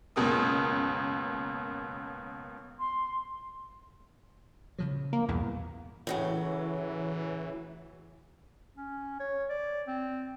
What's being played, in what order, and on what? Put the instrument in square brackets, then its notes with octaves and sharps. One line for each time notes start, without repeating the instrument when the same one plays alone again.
[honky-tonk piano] C#2 F#2 B2 A#3 D#6
[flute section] C6
[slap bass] C#3 F3 F#3
[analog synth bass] A#3
[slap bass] B1 G2 A#2 [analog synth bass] E2
[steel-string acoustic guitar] A2 C#3 F#3 [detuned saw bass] E3
[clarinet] C#4
C#5
D5
C4